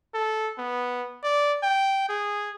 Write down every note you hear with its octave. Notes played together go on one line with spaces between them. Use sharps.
A4
B3
D5
G5
G#4